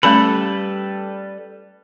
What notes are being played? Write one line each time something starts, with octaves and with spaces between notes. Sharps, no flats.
G3 A3 C#4 A4 B4 B5